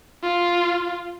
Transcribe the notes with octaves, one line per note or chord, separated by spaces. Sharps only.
F4